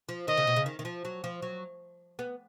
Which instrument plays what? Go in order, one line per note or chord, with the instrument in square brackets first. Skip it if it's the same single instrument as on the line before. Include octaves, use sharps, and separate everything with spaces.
[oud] F3
[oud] D#3 [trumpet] D#5
[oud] C#3
B2
C#3
D#3
D#3
F3
F#3
F3
F#3
B3